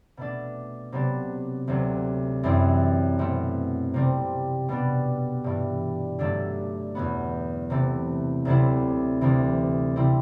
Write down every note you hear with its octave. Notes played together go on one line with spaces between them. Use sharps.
B2 A3 D4
C3 F#3 B3 D4
D2 C3 F#3
F#2 E3 G3 C4 E4
B2 A3 C4
C3 G3 C4
B2 G3 B3 D4
G2 E3 G3
G2 D3 F#3 A3 D4
E2 B2 F#3 B3
C3 E3 A3
D2 C3 F#3 C4 E4
D2 C3 E3
C3 G3 C4 E4